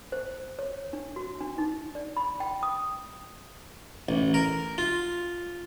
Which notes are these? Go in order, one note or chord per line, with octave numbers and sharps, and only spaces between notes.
C5
C#5
D4
F#4
D4
D#4
D5
B5
G5
D#6
A1
A#4
F4